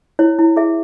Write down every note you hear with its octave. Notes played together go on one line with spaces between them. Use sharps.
E4 C#5
E4
G#4 E5